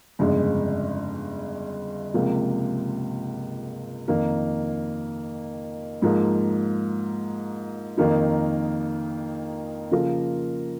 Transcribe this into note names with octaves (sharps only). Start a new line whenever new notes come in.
G1 F2 C#3 G#3
C#2 C3 F3 A#3
F2 D#3 A#3
G#2 F3 A#3
F2 D#3 A#3 D#4
C#3 F3 A#3 F4 A#4